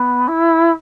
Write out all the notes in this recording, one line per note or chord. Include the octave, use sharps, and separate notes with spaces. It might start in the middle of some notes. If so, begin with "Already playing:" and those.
Already playing: B3
E4